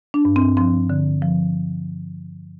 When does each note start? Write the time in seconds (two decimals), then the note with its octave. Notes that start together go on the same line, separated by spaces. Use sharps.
0.14 D4
0.25 G2
0.36 C4
0.57 F3 C4
0.90 D3
1.22 F3